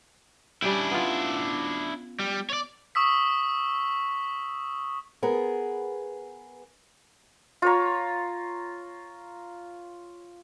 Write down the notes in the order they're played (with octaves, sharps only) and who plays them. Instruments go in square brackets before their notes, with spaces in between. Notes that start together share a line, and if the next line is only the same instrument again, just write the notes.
[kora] G3 C#4 G5 [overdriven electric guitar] D4 E4
[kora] B3 F4
[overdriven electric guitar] G3
C#5 D5
[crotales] C#6 D#6 E6 B6
[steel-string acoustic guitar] B3 G#4 A#4
[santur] F4 C#5 A#5